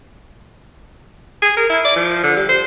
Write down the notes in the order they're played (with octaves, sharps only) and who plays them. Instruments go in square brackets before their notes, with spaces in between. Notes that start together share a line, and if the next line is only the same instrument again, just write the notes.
[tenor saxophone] G#4
A#4
E4
D5
F3
D3
G3
C5